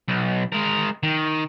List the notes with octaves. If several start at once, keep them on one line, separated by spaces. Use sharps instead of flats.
B1
G#3 A#4
D#3